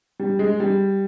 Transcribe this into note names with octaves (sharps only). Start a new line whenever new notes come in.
G3
G#3
G3